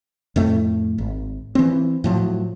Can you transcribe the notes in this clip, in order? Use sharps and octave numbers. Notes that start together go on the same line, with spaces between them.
F2 A2 A3
G#1
E3 C4
A2 F3 F#3